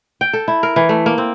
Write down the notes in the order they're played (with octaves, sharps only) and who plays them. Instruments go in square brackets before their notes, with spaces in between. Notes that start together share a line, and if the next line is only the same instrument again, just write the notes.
[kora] G5
A4
E4
A#4
E3
A3
A#3
C4